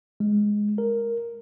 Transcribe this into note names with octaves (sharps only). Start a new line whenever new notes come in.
G#3
A#4